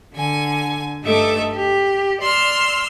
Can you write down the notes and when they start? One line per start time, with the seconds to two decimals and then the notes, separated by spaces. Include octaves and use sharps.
0.14 D3 G#5
1.03 G2 A3 D#4 A4 E5 D6
1.53 G4
2.21 D5 C6 E6 F6